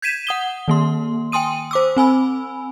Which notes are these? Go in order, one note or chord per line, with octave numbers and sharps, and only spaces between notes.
G6 G#6 B6 D#7 E7
F#5 D#6 G7
D#3 A#3 C6
G5 G#5 C6 D#6 D#7
C5 D6 E6
C4 G#5 B5 E6